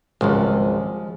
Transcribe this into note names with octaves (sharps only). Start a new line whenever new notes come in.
G#1 C#2 F3 G3 G#3